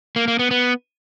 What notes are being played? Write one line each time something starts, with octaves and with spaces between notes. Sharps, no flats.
A#3
A#3
B3
B3